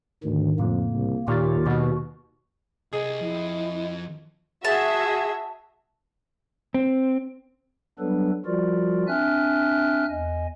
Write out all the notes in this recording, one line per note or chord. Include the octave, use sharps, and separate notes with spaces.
D2 G#2 D#3
F2 A2 C#3 A#3
C2
D#2 A#2 F4 G4 C#6 F6 A6
B2 F#4
C2 G#4 D#5
F2 E4
F#4 G#4 E5 A5
C4
F#3 G3 B3 D4 A4 B4
F3 G3 F4 F#4 A#4 D5
C4 D4 E5 G#5 F6 F#6
E2 D#5 G#5